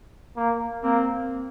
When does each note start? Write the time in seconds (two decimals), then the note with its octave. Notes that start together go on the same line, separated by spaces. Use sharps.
0.37 A#3
0.83 A#3 C4